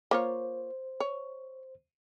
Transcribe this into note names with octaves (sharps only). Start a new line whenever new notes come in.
A#3 F4 C5 C#5
C#5